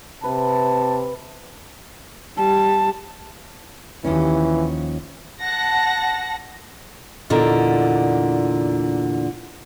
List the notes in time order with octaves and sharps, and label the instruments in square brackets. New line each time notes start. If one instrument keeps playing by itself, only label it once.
[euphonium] C3 [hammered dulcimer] B4 [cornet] A5
[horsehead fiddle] G3 [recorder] A5
[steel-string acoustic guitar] D#2 F3 C#4 [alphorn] E3
[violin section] F#5 A5 A#6
[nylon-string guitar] E2 A#2 D3 D#4